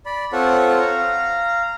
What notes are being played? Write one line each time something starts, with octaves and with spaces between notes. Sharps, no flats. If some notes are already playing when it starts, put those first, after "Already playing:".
D5 B5
C4 F4 A4 C#5 F#5
F5 A#5